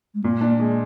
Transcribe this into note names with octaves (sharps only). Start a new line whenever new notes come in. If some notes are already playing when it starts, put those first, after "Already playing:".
G#3
A#2 A#3
D4
A#3
G#3